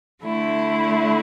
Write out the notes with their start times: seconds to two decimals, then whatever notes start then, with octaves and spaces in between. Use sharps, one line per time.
0.24 D3 A3 E4